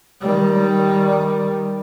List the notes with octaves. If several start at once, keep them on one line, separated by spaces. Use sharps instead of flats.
D#3 G3